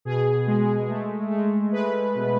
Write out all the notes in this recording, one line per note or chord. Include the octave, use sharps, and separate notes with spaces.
B2 G#4
G#3
A3
A3
G#3 B4
B2